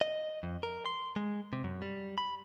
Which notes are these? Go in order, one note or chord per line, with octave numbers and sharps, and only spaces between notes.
D#5
F2
A#4
C6
G#3
C3
F#2
G3
B5